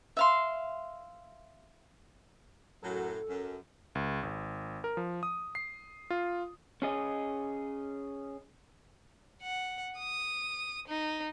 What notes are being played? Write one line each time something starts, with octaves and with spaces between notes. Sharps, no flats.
E5 F5 C6
F#2 A2 F#3 A4
F#2
C#2
G#1
A#4
F3
D#6
C7
F4
C#4 G#4 D#5
F#5
D#6
D#4